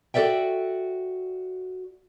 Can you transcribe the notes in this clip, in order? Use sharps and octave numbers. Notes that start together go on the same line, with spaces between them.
F#4 A4 B4 D5 E5 G5